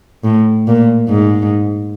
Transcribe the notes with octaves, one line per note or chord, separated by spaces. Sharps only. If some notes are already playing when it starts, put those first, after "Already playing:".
A2
A#2
G#2